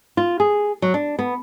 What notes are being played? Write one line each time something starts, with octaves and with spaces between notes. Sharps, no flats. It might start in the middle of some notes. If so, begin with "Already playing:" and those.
F4
G#4
F#3
D4
B3